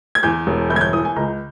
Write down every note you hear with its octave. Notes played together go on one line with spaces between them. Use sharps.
G#6
E2 G6
E1
G1 G6
G#6
G6
E3 D#6
G#5
C#2 A#5